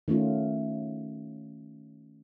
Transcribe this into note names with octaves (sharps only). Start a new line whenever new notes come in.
D#3 A3 C#4 F4